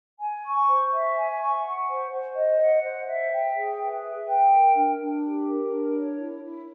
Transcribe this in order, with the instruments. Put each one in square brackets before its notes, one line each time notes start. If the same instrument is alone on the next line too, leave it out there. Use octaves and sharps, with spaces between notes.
[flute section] G#5
C#6
C5
E5
G#5
C#6
F#5
C5
C5
D#5
F#5
C5
E5
G5
G#4
B4
E5
G5
A#4
D4
D4
G4
A#4
D4
C#5
E4
E4